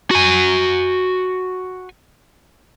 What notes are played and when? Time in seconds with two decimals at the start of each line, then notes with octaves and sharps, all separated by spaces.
0.11 F#4 G#5